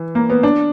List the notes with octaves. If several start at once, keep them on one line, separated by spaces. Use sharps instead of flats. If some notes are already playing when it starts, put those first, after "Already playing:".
Already playing: E3
A#3
B3
D4